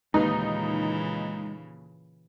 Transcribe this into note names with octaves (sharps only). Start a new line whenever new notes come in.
D#2 A#2 C#3 E3 G#3 D#4 B4